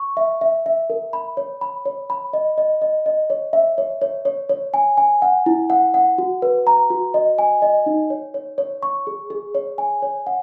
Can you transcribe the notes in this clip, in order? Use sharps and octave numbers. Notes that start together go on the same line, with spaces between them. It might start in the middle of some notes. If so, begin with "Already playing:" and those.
Already playing: C#6
E5
E5
E5
A#4
B5
C#5
B5
C#5
B5
D#5
D#5
D#5
D#5
C#5
E5
C#5
C#5
C#5
C#5
G#5
G#5
F#5
E4
F#5
F#5
F#4
B4
A#5
F#4
D#5
G#5
D#5
D#4
C#5
C#5
C#5
C#6
G#4
G#4
C#5
G#5
C#5
F#5